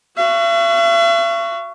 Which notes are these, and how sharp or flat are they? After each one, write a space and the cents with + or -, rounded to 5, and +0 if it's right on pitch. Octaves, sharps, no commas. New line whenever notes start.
F#4 +5 E5 +45